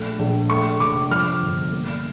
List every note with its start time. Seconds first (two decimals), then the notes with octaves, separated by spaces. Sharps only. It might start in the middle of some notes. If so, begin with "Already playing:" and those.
Already playing: A#1 A3 C#6
0.19 A#1
0.49 A3 C#6
0.80 F1 D6
1.11 F3 F6
1.42 G1
1.72 A#3